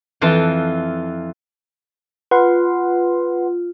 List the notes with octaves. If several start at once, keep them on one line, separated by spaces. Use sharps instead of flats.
F2 E3 F4 A5
F4 B4 F#5 C6